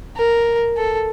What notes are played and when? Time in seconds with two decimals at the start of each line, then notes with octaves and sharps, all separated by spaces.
0.17 A#4
0.76 A4